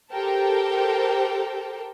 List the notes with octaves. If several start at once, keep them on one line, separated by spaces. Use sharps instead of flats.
G4 A4 A#4 C5 G5 A5